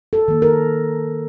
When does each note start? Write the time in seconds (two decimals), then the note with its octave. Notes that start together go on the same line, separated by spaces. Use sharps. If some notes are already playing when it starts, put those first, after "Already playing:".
0.13 A4
0.28 D#3 A#3
0.42 A#4